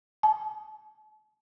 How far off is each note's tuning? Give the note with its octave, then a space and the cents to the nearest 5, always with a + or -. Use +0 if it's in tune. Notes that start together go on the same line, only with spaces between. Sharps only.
A5 -45